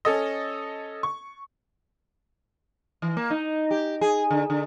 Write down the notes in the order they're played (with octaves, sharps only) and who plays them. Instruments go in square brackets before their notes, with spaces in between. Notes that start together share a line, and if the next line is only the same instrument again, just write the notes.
[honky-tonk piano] C#4 A4 D#5
C#6
[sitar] E3
A#3
D#4
G4
G#4
D3
D3